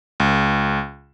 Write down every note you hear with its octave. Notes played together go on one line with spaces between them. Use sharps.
C#2